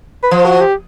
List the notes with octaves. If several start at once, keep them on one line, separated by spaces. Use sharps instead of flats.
B4
F3 C5
F#4
G4